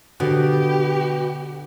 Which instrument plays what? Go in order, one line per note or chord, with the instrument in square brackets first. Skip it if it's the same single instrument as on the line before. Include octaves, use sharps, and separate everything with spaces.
[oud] B2 [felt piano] D3 [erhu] G4